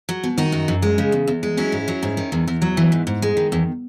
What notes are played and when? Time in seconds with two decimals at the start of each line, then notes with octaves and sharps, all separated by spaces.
0.09 F#3
0.23 B2
0.38 D#3 D#4 F#4
0.52 F#2
0.68 F#2
0.82 G#3
0.98 C#3
1.12 E2
1.28 E2
1.43 G#3
1.57 F#3 C#4 E4
1.72 G#2
1.88 F#3
2.03 G#2
2.17 D#3
2.32 E2
2.47 E2
2.62 F#3
2.77 E3
2.92 G#2
3.07 G#2
3.22 G#3
3.37 D#3
3.52 E2